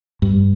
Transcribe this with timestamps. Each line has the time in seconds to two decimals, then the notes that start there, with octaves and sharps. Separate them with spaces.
0.22 G2